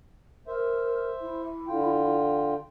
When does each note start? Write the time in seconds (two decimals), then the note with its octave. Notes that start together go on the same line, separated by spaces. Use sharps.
0.47 A#4 C5 E5
1.21 E4
1.67 D3 F4 G5